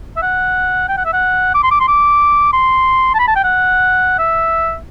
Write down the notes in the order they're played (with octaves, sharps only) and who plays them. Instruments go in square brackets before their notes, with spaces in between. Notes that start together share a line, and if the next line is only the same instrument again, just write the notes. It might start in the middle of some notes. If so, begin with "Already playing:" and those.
[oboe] E5
F#5
G5
F#5
E5
F#5
D6
C6
D6
C6
D6
C6
A5
B5
A5
G5
F#5
E5